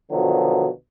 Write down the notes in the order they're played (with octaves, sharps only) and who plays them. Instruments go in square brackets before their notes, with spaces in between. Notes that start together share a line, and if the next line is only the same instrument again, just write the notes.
[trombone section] B2 D3 D#3 F3 F#3